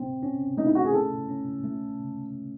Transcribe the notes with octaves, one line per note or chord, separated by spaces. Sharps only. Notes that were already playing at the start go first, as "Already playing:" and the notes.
Already playing: C4
C#4
A3 D#4
E4
F#4
G#4
E4 A4
C#4
A3